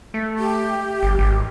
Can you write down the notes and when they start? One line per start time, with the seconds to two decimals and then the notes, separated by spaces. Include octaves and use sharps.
0.14 A3
0.39 G4
1.03 G1
1.19 G#1